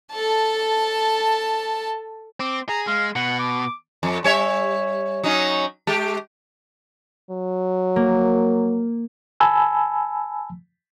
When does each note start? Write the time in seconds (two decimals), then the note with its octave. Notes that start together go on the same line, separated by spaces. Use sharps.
0.12 A4 A5
2.40 C4 D6
2.69 G#4 A#5
2.87 G#3 F5
3.16 B2 F#5
3.39 D6
4.03 F2
4.24 G3 C#5 E5
5.24 F#3 C#4 D#4
5.87 G#3 G4
7.31 F#3
7.96 A#3
9.40 G#5 A5 B5 E6